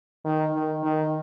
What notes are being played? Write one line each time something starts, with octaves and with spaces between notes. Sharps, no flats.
D#3
D#3
D#3